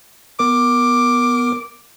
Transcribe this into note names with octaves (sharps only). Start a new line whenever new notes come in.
B3 A#4 D6